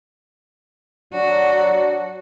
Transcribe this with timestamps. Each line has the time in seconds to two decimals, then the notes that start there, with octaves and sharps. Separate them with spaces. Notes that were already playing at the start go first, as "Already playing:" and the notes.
1.13 F#3 D4 F#4